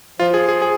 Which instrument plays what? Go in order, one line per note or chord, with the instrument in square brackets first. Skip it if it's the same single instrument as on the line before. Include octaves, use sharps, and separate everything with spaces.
[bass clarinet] F3 [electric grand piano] F4
[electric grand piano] G#4
G#4
G#4